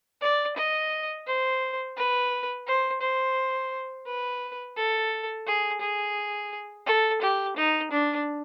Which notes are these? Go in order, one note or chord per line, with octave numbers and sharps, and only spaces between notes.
D5
D#5
C5
B4
C5
C5
B4
A4
G#4
G#4
A4
G4
D#4
D4